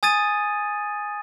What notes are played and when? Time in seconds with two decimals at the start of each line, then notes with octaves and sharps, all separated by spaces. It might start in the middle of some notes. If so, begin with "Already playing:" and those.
0.03 G#5 D#6 G#6 A6 D#7